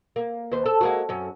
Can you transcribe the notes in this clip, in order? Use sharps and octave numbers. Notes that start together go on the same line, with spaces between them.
A#3
D#2 B4 C5
A4
G#3 A#3 F#4
F#2 C#4